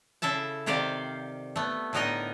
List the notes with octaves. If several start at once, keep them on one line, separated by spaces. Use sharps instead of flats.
C#3 E4 A4 E5 A5
C3 D#3 G4 C5 D5 F5
A3 B3
A2 D3 B3 D#4 A#4 D#5